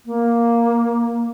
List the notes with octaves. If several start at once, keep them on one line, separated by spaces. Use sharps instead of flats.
A#3